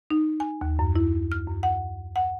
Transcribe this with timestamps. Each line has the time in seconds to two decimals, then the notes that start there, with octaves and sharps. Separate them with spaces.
0.10 D#4
0.40 G#5
0.61 D#2
0.79 F#2
0.96 E4
1.32 F6
1.47 F#2
1.63 F#5
2.16 F#5